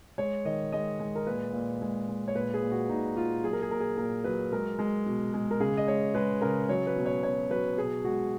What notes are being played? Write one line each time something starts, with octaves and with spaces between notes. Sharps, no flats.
G#3 C#5
D#3 D#5
G#3 D#5
G#3
A#4
A#2 B4
A#2
G#3
G#3
C#5
A#2 B4
G#4
A#2
F#4
A#2 D#4
A#2 F4
F#3 G#4
A#4
G#4
A#2 A#4
G#4
A#2 A#4
F#3 B4
G#3 A#4
G#3
B2
G#3
A#4
C#3 G#4
D#5
G#3 C#5
G#3 B4
C#3 A#4
F#3 C#5
B4
B2
C#5
B2 C#5
F#3 B4
B2 G#4
G#3 F#4